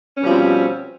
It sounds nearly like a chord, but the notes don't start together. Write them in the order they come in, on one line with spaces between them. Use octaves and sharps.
C#4 B2 G3 F3 C4